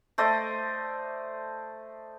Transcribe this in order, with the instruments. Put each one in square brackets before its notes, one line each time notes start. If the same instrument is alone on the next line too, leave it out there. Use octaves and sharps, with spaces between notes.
[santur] A3 C5 D5 D#5